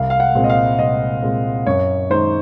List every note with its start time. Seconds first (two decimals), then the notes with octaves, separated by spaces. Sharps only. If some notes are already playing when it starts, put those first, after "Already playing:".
Already playing: C2 F5
0.10 F5
0.20 F#5
0.35 A#2 G#3 C4
0.44 D#5
0.50 F5
0.78 C2 D#5
1.22 A#2 G#3 C4
1.66 F#2 C#5
2.10 D#3 G#3 D#4 C5